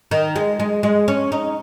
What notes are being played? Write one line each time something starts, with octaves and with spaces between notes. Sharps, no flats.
D#3
G#3
G#3
G#3
C#4
D#4